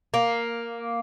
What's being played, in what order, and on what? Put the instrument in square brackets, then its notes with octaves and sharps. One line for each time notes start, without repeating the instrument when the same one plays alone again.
[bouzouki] A#3